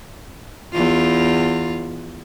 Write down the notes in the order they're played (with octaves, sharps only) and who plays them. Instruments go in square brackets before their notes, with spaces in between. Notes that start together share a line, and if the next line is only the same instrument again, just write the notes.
[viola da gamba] E2 F4